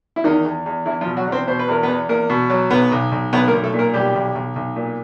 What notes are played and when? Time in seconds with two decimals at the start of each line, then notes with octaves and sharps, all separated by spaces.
0.16 E4
0.24 E2 D#3 D#4
0.45 E2
0.66 E2
0.86 E2 E3 E4
1.01 F3 F4
1.07 B2
1.17 F#3 F#4
1.27 E2
1.32 C4 C5
1.47 B2 C5
1.59 B4
1.68 E2 A#4
1.83 B3 B4
1.88 E2
2.09 E2 A#3 A#4
2.30 B2
2.50 F#3
2.71 B1 B3 B4
2.92 B1
3.12 B1
3.33 B1 B3 B4
3.48 A#3 A#4
3.53 B1
3.64 A3 A4
3.74 A#2
3.79 A#3 A#4
3.94 B1 G3 G4
4.15 B1
4.35 B1
4.56 B1
4.76 A#2